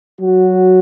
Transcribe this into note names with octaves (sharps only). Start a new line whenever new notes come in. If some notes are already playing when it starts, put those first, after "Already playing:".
F#3 F#4